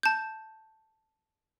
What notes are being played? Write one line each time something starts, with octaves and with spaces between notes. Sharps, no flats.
A5 G6